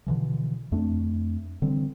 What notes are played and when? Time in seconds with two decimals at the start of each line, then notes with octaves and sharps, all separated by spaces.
0.06 B2 D3 E3 F3
0.72 F2 A3 C4 D4
1.62 D3 E3 G3 C4